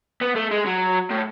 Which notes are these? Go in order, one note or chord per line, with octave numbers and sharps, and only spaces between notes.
B3
A3
G#3
F#3
A2